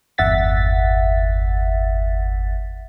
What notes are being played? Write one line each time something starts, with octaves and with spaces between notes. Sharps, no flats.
G1 E2 E5 F#5 A6 B6